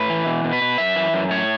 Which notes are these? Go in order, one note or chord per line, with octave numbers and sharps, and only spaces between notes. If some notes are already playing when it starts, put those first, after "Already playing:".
Already playing: A2 B4
E3
B2
B2
B4
B2
F#2 E5
E3
F#2
A2 C#5